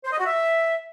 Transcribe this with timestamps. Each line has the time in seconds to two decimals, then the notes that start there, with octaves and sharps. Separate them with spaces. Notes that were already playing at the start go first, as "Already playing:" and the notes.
0.04 C5
0.11 D#5
0.18 F#4
0.26 E5